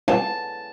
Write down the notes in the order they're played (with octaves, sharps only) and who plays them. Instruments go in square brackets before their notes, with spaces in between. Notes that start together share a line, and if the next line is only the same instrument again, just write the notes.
[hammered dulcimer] A5